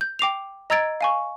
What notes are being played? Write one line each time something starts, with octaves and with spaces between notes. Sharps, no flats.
G6
G5 D6 C7 F7
D#5 A#5 E6 G#6 A6 D7
F5 G#5 C#6